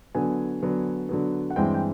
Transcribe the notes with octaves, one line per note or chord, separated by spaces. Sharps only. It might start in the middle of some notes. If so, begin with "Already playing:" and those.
D3 F#3 B3 G#5
D3 F#3 B3
D3 F#3 B3
F#5
G2 E3 G#3 C4 G5
G5